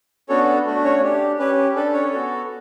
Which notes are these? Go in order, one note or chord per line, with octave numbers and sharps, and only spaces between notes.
B3 C#4 D4 F#4 A4 C#5
A3 D4 F#4
C#4 C#5
D4 G4
C#4 G4 B4
D4 A4 B4
C#4 C#5
B3 F#4 A4